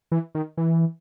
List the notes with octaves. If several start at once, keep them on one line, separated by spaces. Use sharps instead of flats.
E3
D#3
E3